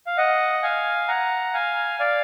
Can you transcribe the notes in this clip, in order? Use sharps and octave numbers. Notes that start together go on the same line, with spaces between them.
F5
D#5 F#5
F5 G#5
F#5 A#5
F5 G#5
D5 F5